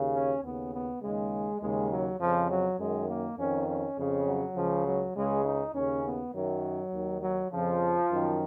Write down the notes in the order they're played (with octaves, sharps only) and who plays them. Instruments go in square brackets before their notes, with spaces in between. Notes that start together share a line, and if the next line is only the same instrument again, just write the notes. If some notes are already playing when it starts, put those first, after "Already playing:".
Already playing: [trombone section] D#2 C#3
C#4
D#2 C#3 B3
B3
D#2 C#3 G#3
D#2 C#3 G#3
F#3
F2 C#3 F3
F#3
F#2 D#3 G#3
A#3
F2 D#3 C#4
C#4
F2 C#3
F#3
C#2 C#3 F3
F#3
C#2 C#3 G#3
D#4
D#2 C#3 C#4
B3
F#2 D#3 F#3
D#2 D#3
F#3
F2 C#3 F3
F#2 D#3